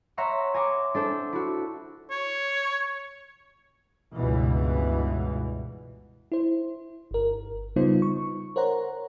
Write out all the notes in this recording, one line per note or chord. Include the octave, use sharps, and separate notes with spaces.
C#5 E5 F#5 A#5 C6 C#6
G#5 A#5 C6 D6
D4 A4 C5
E4 F#4
C#5
C#2 G2 B2 E3
E4 C5
G1 A#4
C#3 G3 B3 D#4 F4 C5
C#6
A#4 C5 C#5 F#5 A#5